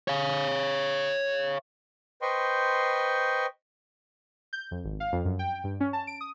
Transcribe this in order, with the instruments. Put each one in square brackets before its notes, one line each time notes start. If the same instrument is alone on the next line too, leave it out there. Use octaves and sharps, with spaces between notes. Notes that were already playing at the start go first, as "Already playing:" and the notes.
[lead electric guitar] C#5 F5
[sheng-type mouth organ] B4 C5 D#5 G5 C6 C#6
[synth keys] G6
F2
G#1
F5
F2
F#2
G5
G2
C#4
A5
D7
D#6